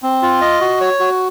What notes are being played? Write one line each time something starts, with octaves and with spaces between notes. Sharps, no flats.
C4
F4
D#5
F#4
C#5
F#4